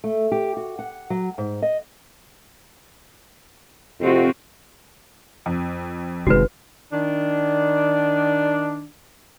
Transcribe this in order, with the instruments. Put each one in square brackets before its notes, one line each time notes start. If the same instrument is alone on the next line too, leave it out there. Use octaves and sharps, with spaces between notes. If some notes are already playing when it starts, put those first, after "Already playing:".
[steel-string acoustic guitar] A3
G4
F#4
F#5
F#3
G#2
D#5
[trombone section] F2 C3 [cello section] C4 F4 F#4
[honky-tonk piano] F2
[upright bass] F#1 D#4 [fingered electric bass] C3 D#3 G#3 [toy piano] F#4 B4
[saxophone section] D#3 D4